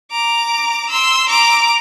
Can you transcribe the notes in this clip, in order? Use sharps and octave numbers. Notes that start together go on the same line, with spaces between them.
A#5 D6
C6 E6
A#5 D6